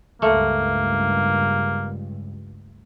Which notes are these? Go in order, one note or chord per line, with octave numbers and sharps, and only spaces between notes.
C#2 G2 A3 A#3 A4